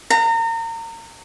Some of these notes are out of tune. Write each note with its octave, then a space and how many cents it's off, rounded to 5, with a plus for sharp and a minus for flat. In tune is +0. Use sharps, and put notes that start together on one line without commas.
A#5 -30